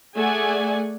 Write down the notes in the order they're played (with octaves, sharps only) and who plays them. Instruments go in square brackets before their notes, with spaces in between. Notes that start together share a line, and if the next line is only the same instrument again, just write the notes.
[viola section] A3 G#4 D5 F#5 G#5